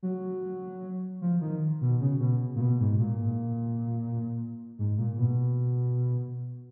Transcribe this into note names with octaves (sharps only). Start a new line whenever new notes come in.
F#3
F3
D#3
B2
C#3
B2
A#2
B2
G#2
A#2
G#2
A#2
B2